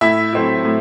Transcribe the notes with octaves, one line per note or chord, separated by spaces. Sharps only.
A2 E4 E5
F#3 A3 C4 E4
A2